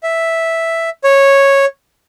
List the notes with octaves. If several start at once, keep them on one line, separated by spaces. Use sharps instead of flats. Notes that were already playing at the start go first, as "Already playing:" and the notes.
E5
C#5